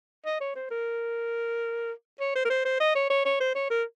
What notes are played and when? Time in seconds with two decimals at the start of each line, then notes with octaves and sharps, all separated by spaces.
0.25 D#5
0.40 C#5
0.55 C5
0.71 A#4
2.20 C#5
2.35 C5
2.45 A#4
2.50 C5
2.65 C5
2.80 D#5
2.95 C#5
3.10 C#5
3.25 C#5
3.40 C5
3.55 C#5
3.70 A#4